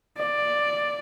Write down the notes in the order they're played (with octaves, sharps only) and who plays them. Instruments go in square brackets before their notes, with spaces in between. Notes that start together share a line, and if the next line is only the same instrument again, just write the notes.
[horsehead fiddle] D5